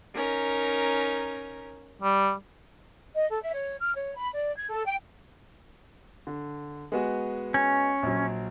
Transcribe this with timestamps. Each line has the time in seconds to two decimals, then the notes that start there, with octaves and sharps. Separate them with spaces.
0.15 C#4 D#4 A#4
2.02 G3
3.15 D#5
3.30 A4
3.42 E5
3.54 C#5
3.81 F6
3.95 C#5
4.17 B5
4.34 D5
4.56 G#6
4.70 A4
4.85 G5
6.27 D3
6.92 G#3 B3 F#4
7.54 C#4
8.03 A#1 F#3